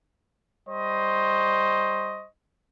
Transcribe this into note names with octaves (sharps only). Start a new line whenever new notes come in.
G3 C5 D#5 C#6